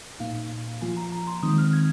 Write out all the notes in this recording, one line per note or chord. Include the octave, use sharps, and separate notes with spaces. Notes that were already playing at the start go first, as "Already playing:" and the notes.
A#2 A#3 D#4 F5
F3 A#3 F4 G#5
A#5
A#5
C6
D#3 G#3 C4 D#4 D#6
F6
G#6